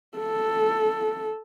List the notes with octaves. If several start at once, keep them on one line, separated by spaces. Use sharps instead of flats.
A4